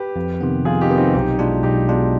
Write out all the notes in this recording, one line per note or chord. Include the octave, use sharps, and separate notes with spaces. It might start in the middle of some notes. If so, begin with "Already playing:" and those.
Already playing: G4 B4
F2
C3 D#3 B3
F2 F4 G#4
D#4 G4
C3 D#3 B3
C4 D#4
B1 D#4 G4
B2 G#3 D4 F4
B1 D#4 G4
B2 G#3 D4 F4